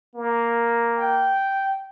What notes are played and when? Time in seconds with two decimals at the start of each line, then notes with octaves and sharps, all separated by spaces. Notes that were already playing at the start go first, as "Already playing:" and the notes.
0.15 A#3
0.97 G5